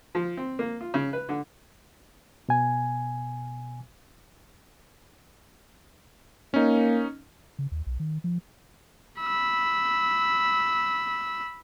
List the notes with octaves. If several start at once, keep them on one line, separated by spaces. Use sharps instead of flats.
F3
C4
A#3
F4
C#3
B4
D3
B2 G#5
A#3 C#4 D#4
C#3
D#2
B1
D#3
F3
B5 E6